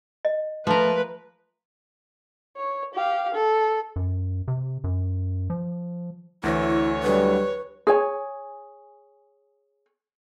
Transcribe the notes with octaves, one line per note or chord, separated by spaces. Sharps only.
D#5
F3 A3 A#4 B4
C#5
G4 F5
A4
F#2
C3
F#2
F3
D2 E3 E4 C#5 A#6
D3 F#3 G3 B4
G#4 C#5 G#5